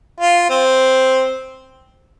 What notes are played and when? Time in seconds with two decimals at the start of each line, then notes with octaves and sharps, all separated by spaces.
0.20 F4
0.50 C4